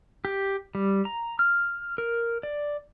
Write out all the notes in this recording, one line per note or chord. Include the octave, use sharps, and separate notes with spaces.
G4
G3
A#5
F6
A#4
D5